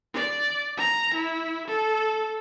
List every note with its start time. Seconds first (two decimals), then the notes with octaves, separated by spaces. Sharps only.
0.14 D5
0.77 A#5
1.14 E4
1.68 A4